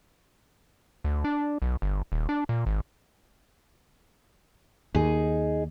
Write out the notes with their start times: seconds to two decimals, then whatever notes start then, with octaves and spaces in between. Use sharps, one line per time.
1.04 D2
1.24 D4
1.62 B1
1.82 G1
2.12 D#1
2.29 D4
2.49 A#2
2.66 G#1
4.95 D#2 D#4 G#4 D#5